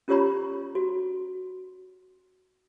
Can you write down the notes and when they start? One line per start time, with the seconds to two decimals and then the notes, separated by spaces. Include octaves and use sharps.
0.08 C#4 F4 G4 C#5 A#5 B5
0.75 F#4